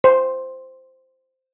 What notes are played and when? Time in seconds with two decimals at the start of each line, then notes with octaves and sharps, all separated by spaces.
0.04 C5